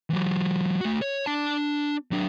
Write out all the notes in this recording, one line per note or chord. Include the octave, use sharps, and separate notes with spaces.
E3 F#3
A3 F#4
C#5
D4 A5
F#3 D4